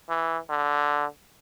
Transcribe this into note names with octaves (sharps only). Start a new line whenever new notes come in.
E3
D3